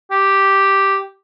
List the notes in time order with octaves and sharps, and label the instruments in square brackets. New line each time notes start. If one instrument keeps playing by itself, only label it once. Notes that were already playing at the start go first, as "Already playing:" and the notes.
[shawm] G4